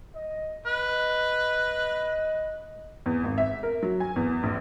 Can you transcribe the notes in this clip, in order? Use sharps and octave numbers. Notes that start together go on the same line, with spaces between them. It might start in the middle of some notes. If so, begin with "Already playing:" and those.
D#5
B4 D#5
E2
G#1
E5
A#4
F#3
G#5
E2
A#1